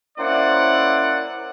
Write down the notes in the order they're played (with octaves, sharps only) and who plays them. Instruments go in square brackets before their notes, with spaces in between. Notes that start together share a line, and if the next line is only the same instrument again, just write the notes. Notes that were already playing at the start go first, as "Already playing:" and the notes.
[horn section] A#3 C#4 E4 C5 D5 F#5